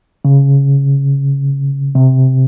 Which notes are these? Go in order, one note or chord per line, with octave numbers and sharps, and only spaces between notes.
C#3
C3